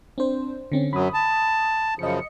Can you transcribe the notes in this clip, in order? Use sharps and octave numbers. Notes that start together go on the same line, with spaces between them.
C4 D4 C5
D3 C4 C#4
F#2 F#3 B5 D#6
A5
F#2 C#3 F3 D#5 C#7